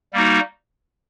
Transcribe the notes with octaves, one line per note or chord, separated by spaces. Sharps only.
G3 A#3 D#4 F#4